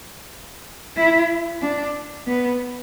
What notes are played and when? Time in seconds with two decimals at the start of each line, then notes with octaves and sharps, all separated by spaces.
0.97 E4
1.62 D4
2.27 B3